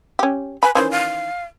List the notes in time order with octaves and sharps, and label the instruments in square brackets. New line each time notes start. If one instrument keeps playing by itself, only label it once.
[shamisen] C#4 G4
[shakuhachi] B4 [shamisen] G#5 B5
[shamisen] D#3 E3 C#4 [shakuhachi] C5
[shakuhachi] F5